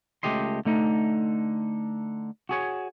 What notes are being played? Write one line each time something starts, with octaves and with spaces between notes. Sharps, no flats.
C#2 F3 A3 G4 D#5 C6
D3 A3 D#4
F#4 G#4 C#5